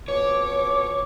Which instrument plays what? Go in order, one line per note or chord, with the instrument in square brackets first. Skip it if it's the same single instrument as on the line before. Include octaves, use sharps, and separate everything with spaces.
[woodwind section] F2 B2 D6 [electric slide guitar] C#5